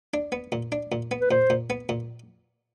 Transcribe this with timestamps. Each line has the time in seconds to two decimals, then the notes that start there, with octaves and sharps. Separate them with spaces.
0.14 D4
0.32 B3
0.52 A#2
0.72 D4
0.92 A#2
1.11 B3
1.21 B4
1.31 A#2 C5
1.50 A#2
1.70 B3
1.89 A#2